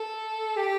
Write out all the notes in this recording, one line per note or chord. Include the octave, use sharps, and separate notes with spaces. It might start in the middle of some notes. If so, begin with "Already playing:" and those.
Already playing: A4
G4